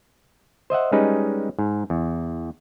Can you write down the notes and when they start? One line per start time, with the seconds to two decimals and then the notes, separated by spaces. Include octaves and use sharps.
0.70 C5 D#5 E5 F#5
0.92 G3 G#3 C#4 D#4 B4
1.59 G#2
1.90 E2